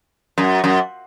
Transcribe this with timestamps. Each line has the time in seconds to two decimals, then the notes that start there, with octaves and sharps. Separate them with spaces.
0.38 F#2
0.64 F#2